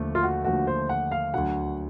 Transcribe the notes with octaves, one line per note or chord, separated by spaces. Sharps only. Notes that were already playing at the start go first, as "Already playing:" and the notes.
Already playing: D#2 D3 F3 A3
F4
F#4
D#2 D3 F3 A3 F#4
C5
F#5
F5
D2 D3 F#3 F#5